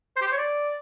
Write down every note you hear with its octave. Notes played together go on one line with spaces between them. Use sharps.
C5
G4
C5
C#5
D5